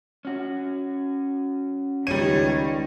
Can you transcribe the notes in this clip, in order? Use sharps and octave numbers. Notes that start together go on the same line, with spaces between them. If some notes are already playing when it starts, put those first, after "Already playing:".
C#4 F#4
C#2 D#3 G3 C#5 D#7